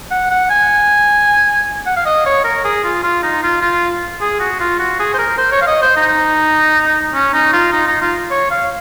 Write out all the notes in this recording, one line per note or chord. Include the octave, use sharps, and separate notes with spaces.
F#5
F#5
G#5
F#5
F5
D#5
C#5
A#4
G#4
F4
F4
D#4
F4
F4
G#4
F#4
F4
F#4
G#4
C5
A#4
C5
C#5
F5
D#5
C5
D#4
C#4
D#4
F4
D#4
D#4
F4
C#5
F5